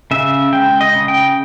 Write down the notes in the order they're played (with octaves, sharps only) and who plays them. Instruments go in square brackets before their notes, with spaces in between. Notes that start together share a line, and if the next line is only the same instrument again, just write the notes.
[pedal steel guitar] C#3 E5
G#3 G5
D#5
C#3
G5